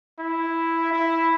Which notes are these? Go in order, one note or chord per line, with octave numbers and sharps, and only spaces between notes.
E4
E4